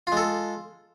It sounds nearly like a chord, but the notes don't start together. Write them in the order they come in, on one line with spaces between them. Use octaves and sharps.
F4 G#3 A4